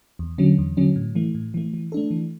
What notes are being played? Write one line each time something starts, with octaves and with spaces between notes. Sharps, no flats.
E2
D3 F#3 C#4
E2
D3 F#3 C#4
A2
E3 A3
A2
E3 A3
E3
A3 D4 A4
E3